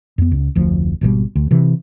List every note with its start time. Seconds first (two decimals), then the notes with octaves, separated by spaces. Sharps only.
0.18 F2 B3
0.32 C#2
0.55 F1 D2 F3
1.01 G#1 B2 D#3 G3
1.35 D2
1.51 C3 E3